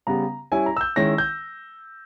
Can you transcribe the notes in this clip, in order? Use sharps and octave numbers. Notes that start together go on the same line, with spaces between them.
C#3 G3 B3 A#5
G3 C#4 E4 G#5
A#5
E6
G6
D#3 G#3 C#4 E4 A#6
G6